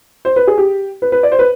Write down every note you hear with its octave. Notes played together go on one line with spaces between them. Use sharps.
C5
B4
G#4
G4
B4
B4
D5
C5
B4